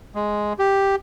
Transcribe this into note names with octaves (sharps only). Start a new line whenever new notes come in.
G#3
G4